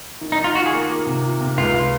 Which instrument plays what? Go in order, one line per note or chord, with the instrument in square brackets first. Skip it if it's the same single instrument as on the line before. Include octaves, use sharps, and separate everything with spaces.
[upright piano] D#3
[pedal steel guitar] D#4
[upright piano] D#3
[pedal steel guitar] F4
[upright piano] F4 [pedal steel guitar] F#4
[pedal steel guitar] G#4
[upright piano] A#3
A#3
C3
F4
C3
[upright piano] C#2 [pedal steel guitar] F4